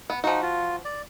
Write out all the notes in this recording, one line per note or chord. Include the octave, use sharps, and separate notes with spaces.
B3
F3 D#4 F#4
F4
D5